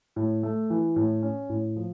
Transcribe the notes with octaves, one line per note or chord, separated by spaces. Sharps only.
A2
A3
E3
A2
C#4
A2
F3